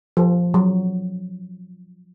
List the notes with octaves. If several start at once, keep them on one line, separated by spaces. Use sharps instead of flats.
F3
F#3